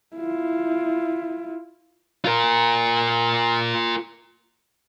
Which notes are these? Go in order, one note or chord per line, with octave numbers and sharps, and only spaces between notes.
E4 F4
F4 A#4